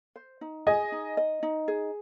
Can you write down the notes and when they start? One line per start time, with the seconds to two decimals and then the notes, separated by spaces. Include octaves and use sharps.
0.16 C5
0.41 D#4
0.67 G#4 D#5 G#5
0.92 D#4
1.17 D#5
1.43 D#4
1.68 G#4